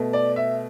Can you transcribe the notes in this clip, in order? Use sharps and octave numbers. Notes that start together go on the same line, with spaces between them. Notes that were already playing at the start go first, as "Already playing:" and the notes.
Already playing: B2 A3
D5
E5